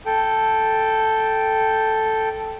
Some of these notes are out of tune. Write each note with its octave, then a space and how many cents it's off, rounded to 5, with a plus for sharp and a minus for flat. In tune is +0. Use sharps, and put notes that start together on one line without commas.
A4 +0 G5 +0